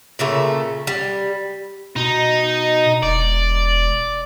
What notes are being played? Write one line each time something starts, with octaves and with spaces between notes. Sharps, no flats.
A#2 C#3 A3
G3
B2 D#4
E1 D5